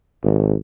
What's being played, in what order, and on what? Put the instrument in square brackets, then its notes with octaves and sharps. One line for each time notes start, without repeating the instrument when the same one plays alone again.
[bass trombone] G#1